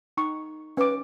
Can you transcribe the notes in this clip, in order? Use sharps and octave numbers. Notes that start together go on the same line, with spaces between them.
D#4 C#6
C#4 B4 D6